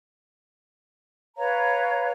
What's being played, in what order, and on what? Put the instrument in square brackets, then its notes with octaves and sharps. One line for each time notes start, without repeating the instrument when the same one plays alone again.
[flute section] B4 C#5 F5 A#5